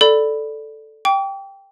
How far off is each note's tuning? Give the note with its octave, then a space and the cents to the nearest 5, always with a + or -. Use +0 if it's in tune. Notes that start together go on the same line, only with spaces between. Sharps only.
A4 +0 D5 +0 B5 +5
G5 +0 D6 -45